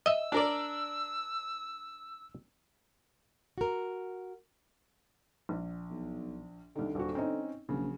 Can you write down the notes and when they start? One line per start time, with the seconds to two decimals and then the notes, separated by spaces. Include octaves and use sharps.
0.06 D#5 E5 E6
0.32 D4 A#4 D5
3.58 F#4 A#4
5.49 A#1
5.90 B1
6.76 C2 D3 D#3
6.95 D#1 F#4
7.15 C4 C#4 D#4
7.69 A#1 C#3 F#3